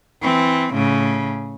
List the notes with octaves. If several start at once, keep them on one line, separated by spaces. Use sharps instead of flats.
E3 C4
A2 C#3